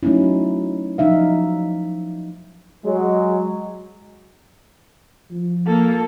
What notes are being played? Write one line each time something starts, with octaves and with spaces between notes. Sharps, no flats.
F#3 A3 C#4 D#4 E4
F3 F#3 D#4 E5 F5
F#3 G#3
F3
A#3 A4